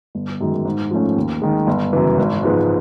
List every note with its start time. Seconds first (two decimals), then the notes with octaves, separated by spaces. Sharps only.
0.15 G1
0.41 F#2 D#3 G#3
0.65 G#2
0.91 F3 A3 C#4
1.16 D#2
1.42 D#3 G#3
1.67 G1
1.93 F#2 C#3 E3
2.18 G#1
2.43 G#2 F3 G#3 B3